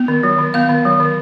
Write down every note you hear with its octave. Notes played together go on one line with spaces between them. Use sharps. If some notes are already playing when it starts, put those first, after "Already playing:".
Already playing: B3
D#3
F#3
D#3
B3 F5
D#3
F#3
D#3